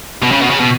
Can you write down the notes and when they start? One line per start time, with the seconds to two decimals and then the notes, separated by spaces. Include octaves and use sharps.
0.22 B2
0.31 C#3
0.41 B2
0.50 C#3
0.60 B2